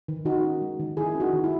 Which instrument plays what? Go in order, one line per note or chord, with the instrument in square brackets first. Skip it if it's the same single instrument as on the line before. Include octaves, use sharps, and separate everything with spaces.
[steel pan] D#3
D#3 D#4 F#4
C#4
G#3
D#3
D#3 E4 G#4
C#4
D#4 F#4
D#3
E4